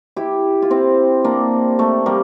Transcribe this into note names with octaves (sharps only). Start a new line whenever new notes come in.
E4 G4
F4
C4 E4
A#3 D4
A3
G3 A#3